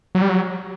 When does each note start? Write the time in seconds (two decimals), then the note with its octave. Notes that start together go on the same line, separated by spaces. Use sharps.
0.15 F#3
0.22 G3
0.29 F#3